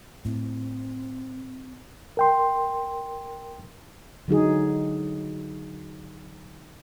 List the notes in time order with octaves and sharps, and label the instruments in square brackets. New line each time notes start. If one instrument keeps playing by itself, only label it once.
[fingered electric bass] A2 [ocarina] C4
[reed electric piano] A#4 G5 C6
[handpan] D3 F#3 D#4 G#4